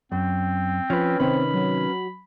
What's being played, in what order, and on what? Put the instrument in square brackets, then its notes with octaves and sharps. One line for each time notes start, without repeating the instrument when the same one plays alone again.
[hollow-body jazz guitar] F#2 [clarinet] C4
[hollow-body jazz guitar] F3 [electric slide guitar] C#4 B4
[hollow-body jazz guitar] C3 D#3 [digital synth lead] C4 [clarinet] B5
[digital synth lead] F#3